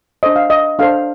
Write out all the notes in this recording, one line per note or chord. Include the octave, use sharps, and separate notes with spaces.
D4 A4 C5 D#5
F5
D#5
D4 A4 C5 F5